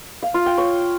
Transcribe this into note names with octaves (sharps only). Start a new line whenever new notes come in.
F5
F4
G5
C#5